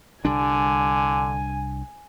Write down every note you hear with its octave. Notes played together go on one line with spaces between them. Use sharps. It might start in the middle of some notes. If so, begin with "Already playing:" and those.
C2 D3 G3 D4 G#5